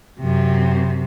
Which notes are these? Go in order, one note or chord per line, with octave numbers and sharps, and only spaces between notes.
F#2 C3